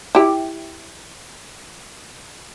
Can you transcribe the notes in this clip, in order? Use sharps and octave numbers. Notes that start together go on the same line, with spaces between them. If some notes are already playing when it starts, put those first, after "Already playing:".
E4 G4